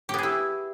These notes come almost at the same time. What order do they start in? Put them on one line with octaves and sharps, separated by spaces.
G4 B3 G#4 E4